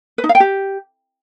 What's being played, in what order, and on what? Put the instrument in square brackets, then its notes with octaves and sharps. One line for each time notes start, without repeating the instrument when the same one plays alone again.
[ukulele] B4
D#4
F5
G5
G4